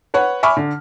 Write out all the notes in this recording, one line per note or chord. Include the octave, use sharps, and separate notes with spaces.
B4 C#5 F#5
E5 G#5 B5 C#6 D6 F6
D3